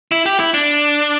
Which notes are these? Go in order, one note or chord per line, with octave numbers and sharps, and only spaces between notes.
E4
G4
E4
D4